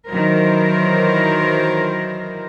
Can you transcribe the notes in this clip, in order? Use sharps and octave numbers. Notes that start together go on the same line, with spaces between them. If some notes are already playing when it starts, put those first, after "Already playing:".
D#3 E3 F#3 A#4 C5